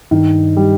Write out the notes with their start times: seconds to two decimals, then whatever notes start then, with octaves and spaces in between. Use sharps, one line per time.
0.11 G2 D#3
0.57 G3